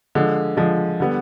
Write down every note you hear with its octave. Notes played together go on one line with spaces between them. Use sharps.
D3 F3 G#3
D3 F3 G#3
D3 G3 B3